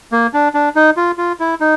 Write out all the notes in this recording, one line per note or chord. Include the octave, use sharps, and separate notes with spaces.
A#3
D4
D4
D#4
F4
F4
E4
D#4